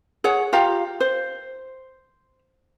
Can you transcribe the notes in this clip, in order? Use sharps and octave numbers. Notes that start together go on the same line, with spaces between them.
G#4 C#5 F#5
F4 G4 F5 A#5
C5